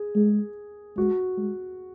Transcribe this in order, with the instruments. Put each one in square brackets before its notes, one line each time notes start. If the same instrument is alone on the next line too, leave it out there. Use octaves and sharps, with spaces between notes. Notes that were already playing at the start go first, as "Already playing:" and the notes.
Already playing: [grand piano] G#4
[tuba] G#3
[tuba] G#3 [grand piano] F#4
[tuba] G#3